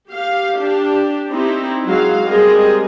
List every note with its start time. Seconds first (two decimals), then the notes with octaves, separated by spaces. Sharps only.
0.12 G4 F5
0.58 D4 G4
1.33 C4 D#4 E4 G4
1.85 F#3 G#3 F5
2.28 G3 G#3 C4 G#4 A#4 D#5